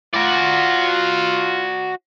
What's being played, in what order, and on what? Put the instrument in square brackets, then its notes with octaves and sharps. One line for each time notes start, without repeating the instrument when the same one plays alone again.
[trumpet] F4 [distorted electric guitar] F#4 D5